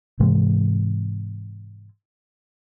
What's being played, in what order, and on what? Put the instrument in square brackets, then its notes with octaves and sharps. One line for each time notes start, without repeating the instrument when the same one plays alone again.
[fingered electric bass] G#2 C3 E3 G#3